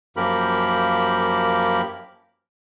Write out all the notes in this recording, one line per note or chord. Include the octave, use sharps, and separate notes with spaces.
F#2 F3 A#3 G4 A#4 B5